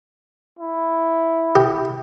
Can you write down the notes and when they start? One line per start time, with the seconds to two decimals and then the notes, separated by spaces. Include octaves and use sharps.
0.59 E4
1.56 G4